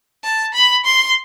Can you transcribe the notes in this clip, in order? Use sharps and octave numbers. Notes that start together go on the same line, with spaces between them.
A5
B5
C6